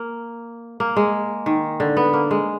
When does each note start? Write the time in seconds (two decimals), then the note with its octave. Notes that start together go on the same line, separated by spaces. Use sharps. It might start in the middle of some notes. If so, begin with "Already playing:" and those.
Already playing: A#3
0.80 A#3
0.96 G#3
1.46 D#3
1.80 D3
1.97 B3
2.13 A#3
2.31 G#3